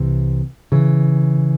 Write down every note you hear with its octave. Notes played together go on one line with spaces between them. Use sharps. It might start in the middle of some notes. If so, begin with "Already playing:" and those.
Already playing: C2 C3 E3
C#3 E3